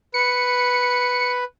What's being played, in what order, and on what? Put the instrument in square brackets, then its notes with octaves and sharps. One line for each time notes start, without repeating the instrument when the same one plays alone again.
[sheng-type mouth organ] B4 [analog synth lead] C#7